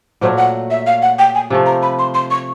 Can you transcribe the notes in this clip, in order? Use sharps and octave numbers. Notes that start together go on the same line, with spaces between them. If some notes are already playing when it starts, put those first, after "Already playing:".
A#2 F#3 A3 C5
F#5
E5
F5
F#5
G5
G#5
C3 F3 A3
A#5
B5
C6
C6
C#6